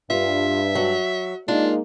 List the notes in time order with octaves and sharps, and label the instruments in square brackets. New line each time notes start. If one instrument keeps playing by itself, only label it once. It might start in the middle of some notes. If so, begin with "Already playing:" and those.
[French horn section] G2 [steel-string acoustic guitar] F4 [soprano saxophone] E5
[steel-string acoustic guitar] F#3
[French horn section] G#3 A#3 D#4 [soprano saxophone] D4 [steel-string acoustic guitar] F4